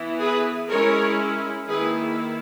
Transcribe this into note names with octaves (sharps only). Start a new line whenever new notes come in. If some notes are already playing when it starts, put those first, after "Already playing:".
Already playing: E3 B3 E4
G#4 B4
G#3 C#4 E4 A#4 C#5
D#3 A#3 E4 G#4 B4